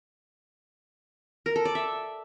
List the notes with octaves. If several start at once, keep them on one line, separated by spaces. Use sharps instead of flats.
A#4
A4
D5
E5